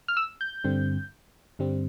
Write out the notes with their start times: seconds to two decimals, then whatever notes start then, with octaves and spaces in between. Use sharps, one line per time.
0.08 F6
0.17 E6
0.41 G6
0.64 G2 D3 G3 C4
1.59 G2 D3 G3 C4